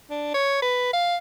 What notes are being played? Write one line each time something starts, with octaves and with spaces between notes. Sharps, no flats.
D4
C#5
B4
F5